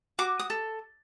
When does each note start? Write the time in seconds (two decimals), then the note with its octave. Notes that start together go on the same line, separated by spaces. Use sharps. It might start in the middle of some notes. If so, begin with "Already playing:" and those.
0.19 F#4 D6
0.39 D#6
0.50 A4